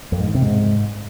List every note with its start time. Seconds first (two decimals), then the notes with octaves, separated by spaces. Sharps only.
0.12 F2
0.19 G#2
0.27 D#3
0.35 C3
0.42 G#2